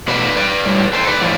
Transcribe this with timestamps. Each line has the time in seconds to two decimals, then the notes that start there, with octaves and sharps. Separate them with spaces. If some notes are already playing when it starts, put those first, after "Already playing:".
0.08 B2 A3 B4 D5
0.36 B4 D5
0.65 A2 G3
0.93 A4 C5
1.07 B4 D5
1.21 A2 F3 A3